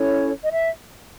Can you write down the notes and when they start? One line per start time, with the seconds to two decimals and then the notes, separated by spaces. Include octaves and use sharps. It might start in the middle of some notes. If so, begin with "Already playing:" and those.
Already playing: C#4 E4 A4 C#5
0.43 D#5
0.49 E5